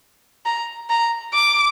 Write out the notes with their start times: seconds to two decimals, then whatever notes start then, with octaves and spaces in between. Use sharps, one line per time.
0.46 A#5
0.90 A#5
1.34 D6